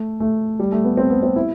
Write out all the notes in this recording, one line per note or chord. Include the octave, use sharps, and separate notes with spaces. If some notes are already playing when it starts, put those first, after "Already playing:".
Already playing: A3
A3
G3
A3
B3
C4
B3
C4
E4